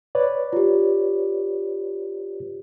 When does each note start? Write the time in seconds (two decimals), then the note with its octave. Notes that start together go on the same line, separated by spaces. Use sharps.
0.15 B4 C#5 D5
0.53 F4 G4